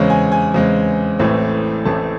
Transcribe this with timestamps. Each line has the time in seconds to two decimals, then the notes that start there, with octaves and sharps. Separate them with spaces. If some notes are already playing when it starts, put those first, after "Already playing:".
Already playing: E2 C#3 G#3 C4 C#5
0.10 G#5
0.32 G#5
0.54 E2 C#3 G#3 C4
1.19 A1 A2 E3 A3 C4
1.85 A1 A2 E3 A3 C4 A5